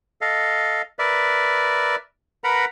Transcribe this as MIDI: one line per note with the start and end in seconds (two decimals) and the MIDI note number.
0.21 0.82 69
0.21 0.82 75
0.21 0.82 77
0.99 1.96 70
0.99 1.96 71
0.99 1.96 74
0.99 1.96 76
2.44 2.65 70
2.44 2.65 71
2.44 2.65 78
2.44 2.65 82
2.44 2.65 83